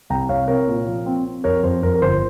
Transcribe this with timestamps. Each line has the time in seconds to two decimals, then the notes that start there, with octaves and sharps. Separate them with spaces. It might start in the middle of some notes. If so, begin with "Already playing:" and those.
0.10 C2 G5 A#5
0.29 C2 C#5 F5
0.48 C4 A#4 C#5
0.67 A#2
0.87 F3
1.06 C4
1.25 C4
1.44 F2 A#4 C#5
1.63 F2 C5
1.82 F2 A#4
1.94 A#4
2.02 G1 C5